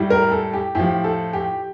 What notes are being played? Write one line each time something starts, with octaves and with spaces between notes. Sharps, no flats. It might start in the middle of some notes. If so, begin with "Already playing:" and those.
Already playing: A2 G3
A#4
A4
G4
A2 F3 G4
A4
G4